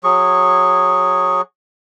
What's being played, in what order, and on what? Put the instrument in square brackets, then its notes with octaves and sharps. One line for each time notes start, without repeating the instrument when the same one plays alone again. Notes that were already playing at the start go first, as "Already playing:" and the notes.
[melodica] F#3 G#4 C#6